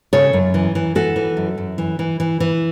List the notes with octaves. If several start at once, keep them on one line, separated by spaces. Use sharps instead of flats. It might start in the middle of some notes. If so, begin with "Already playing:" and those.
C#3 A4 C#5
F#2
E3
E3
E3 F#4 A4
E3
F#2
F#2
E3
E3
E3
E3